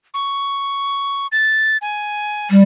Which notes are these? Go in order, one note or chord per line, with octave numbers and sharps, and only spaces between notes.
C#6
A6
G#5
G3